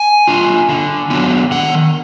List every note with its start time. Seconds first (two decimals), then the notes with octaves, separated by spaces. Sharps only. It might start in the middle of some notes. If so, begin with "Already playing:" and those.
Already playing: G#5
0.28 D4 F4
0.69 D3
1.10 F#3 B3 D4
1.51 D#3 F#5